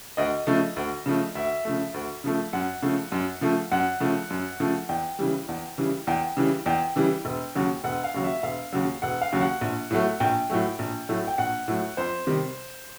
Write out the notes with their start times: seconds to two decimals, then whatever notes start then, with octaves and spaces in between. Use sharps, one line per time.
0.17 D2 D#5
0.47 C#3 F3 A3
0.76 D2
1.06 C#3 F3 A3
1.35 D2 E5
1.65 C#3 F3 A3
1.94 D2
2.24 C#3 F3 A3
2.53 F#2 F#5
2.82 C#3 F3 A3
3.12 F#2
3.41 C#3 F3 A3
3.72 F#2 F#5
4.00 C#3 F3 A3
4.30 F#2
4.60 C#3 F3 A3
4.89 E2 G5
5.19 C#3 E3 G3
5.49 E2
5.78 C#3 E3 G3
6.07 E2 G5
6.37 C#3 E3 G3
6.66 E2 G5
6.96 C#3 E3 G3
7.25 E1
7.55 D#2 C#3 F#3
7.84 E1 F#5
8.04 F5
8.14 D#2 C#3 F#3
8.23 E5
8.43 E1 F5
8.73 D#2 C#3 F#3
9.02 E1 F#5
9.22 F5
9.32 D#2 C#3 F#3
9.41 F#5
9.61 A#1
9.91 A2 F#3 A3
10.20 A#1 G5
10.50 A2 F#3 A3
10.79 A#1
11.09 A2 F#3 A3
11.27 G5
11.38 A#1 F#5
11.68 A2 F#3 A3
11.97 F2 C5
12.27 C3 D#3 G3